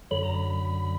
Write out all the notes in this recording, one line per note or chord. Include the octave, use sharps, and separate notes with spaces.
F#2 D3 F#3 B5
A#5
B5